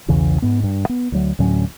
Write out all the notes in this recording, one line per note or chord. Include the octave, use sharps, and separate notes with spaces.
B1 E2 C#3 E3
G#2 B3
G2
B3
D2 F#3
D2 A2 F#3 C#4